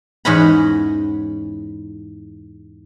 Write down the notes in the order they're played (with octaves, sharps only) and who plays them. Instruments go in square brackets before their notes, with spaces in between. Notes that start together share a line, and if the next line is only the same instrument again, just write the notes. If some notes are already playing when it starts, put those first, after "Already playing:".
[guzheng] E2 G#2 C#4 D#5 F#5 B5